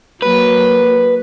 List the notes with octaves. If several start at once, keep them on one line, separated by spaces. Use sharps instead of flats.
F#3 A#3 B4